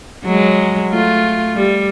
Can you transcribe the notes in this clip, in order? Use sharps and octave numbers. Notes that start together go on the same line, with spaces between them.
F#3 G#3
A3 F4
G3